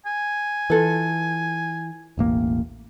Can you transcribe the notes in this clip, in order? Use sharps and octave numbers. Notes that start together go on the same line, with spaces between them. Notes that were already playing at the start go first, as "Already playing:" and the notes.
G#5
E3 F4 A4 B4
E1 A1 A#3